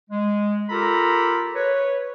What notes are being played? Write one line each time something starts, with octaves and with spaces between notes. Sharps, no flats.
G#3
F4 G4 A4 A#4 A#5 B5
B4 C#5